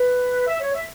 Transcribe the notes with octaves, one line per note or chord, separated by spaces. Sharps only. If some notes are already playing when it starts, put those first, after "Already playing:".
Already playing: B4
E5
C#5
E5